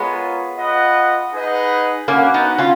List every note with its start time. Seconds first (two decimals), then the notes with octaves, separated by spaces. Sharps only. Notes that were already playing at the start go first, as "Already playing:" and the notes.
Already playing: G#3 B3 F4 A#4 C#5
0.58 F4 B4 D#5 F#5
1.33 D#4 G#4 B4 D#5 F#5
2.08 A#3 C#4 F#4 B4 F#5
2.34 B3 D#4
2.58 C#4 F4